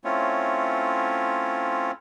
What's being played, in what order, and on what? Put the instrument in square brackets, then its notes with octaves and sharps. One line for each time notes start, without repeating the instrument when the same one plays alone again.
[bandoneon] A3 C4 C#4 E4 F4 C#5